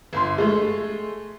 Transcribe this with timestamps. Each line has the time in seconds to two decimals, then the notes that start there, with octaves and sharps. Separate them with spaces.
0.13 G1 C6
0.38 G#3 A3